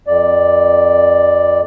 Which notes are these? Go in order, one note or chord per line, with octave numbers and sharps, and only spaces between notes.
F2 D5